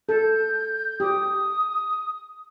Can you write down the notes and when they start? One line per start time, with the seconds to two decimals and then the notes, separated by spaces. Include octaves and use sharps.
0.09 A4 G6
1.00 G4 D#6